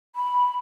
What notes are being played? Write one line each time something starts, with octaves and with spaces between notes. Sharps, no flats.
B5